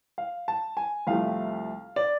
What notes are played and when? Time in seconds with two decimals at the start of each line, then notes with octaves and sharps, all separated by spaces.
0.18 F5
0.48 A5
0.77 G#5
1.07 C2 C3 F3 A3 F5
1.96 D5